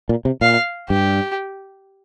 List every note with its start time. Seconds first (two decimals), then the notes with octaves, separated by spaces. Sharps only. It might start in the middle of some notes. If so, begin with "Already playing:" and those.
0.09 A#2
0.25 C3
0.41 A#2 F5
0.90 G2 G4